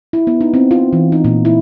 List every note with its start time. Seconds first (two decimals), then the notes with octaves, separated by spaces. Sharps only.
0.13 E4
0.27 B3
0.41 D#4
0.54 C4
0.71 F4
0.93 E3
1.12 D#4
1.24 A#2
1.45 E4